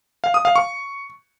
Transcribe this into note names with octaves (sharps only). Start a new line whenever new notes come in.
F5
D#6
F5
C#6